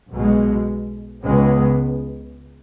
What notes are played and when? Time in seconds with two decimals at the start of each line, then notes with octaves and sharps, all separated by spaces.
0.11 B1 B2 G#3
1.23 C#2 C#3 G#3 B3